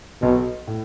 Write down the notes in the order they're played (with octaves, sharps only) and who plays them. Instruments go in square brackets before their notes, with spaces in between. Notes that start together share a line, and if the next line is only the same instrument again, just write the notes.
[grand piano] B1 [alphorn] B2
[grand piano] A2